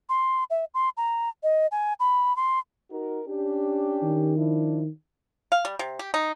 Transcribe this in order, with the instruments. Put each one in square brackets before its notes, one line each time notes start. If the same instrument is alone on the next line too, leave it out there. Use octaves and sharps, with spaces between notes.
[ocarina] C6
E5
C6
A#5
D#5
G#5
B5
C6
[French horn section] D#4 F#4 A#4
C#4 D4 G4
[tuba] D#3
[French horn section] F3 D4 E4
[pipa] F5
G3
C3
G4
D#4